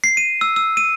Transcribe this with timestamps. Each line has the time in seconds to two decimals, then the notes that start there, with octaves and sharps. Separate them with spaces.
0.04 C7
0.17 D#7
0.41 E6
0.56 E6
0.77 D#7